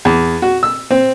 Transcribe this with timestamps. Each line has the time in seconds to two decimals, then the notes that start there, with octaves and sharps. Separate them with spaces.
0.05 E2
0.42 F#4
0.63 E6
0.91 C4